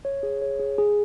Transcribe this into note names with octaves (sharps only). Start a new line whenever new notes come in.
C#5
G#4
C#5
G#4
G#4